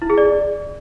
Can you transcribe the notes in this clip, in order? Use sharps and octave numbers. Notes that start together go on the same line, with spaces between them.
E4
G#4
D5